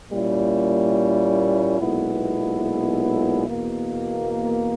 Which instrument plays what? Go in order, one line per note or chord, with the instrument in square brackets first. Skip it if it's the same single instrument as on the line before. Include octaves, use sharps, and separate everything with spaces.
[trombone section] A#2 G3 A#3 C#4 E4
B1 A#2 G#3 B3 E4
E2 B2 A#3